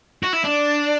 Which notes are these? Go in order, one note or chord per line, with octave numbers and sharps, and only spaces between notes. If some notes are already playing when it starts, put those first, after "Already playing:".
F#4
E4
D4